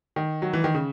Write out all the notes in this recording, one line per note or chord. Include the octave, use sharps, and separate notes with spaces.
D#3
F#3
E3
D#3
C#3